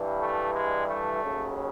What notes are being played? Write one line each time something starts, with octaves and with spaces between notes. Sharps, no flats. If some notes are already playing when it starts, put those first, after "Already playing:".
Already playing: G2 E3 G3
A3
G#3
A3
D#2 C#3 F#3